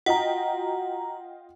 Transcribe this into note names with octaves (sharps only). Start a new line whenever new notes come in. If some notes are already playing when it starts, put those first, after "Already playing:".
F4 F#4 D#5 F#5 G5 A#5